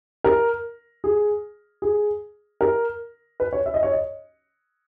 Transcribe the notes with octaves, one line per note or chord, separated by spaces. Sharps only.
A#4
G#4
G#4
A#4
B4
C#5
E5
D#5
C#5
D#5